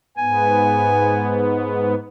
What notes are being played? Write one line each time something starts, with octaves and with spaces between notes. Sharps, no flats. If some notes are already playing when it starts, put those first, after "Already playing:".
G#2 B3 G#5